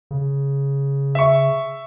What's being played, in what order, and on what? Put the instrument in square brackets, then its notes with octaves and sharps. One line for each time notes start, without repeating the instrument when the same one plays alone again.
[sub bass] C#3
[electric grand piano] E5 C#6